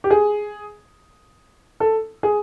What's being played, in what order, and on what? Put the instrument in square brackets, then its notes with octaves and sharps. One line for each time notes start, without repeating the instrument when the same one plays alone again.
[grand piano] G4
G#4
A4
G#4